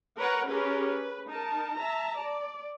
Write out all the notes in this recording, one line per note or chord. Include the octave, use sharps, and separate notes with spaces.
A#4 B4 C#5 F#5 A#5
C#4 G4 G#4 A#4 B4
B4
D#4 A#4 A5
E5 A5 A#5
D5